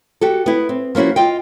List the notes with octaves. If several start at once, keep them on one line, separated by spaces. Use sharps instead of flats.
F#4 G4 A4
B3 E4
C4
F3 A#3 C#4 E4 F#4
F4 D#5 G5